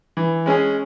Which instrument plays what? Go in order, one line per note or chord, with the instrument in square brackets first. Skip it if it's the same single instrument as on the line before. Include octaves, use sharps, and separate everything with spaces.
[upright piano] E3
G#3 C#4 G#4